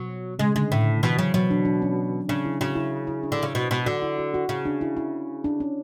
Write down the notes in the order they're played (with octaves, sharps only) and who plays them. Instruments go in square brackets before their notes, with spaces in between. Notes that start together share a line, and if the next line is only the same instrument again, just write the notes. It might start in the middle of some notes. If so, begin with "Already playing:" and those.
Already playing: [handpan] B2 [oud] F#3
[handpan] C#3 [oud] G#3
[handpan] D3 [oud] G#3
[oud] A2
[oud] B2 [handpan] E3
[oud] C#3 [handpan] F#3
[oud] B2 [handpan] F#3
[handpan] D4
D4
C#4
[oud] C#3 [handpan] D4
[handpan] E4
[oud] C#3 [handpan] F#4
[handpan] E4
E4
D4
[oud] D3
[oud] C#3 [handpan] E4
[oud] B2
B2
[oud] D3 [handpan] F#4
[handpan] E4
F#4
F#4
[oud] C#3
[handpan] D4
E4
E4
D4
C#4